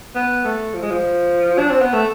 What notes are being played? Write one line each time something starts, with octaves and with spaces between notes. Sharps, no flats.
B3
A3
F3
G#3
F3
D4
C4
B3
A3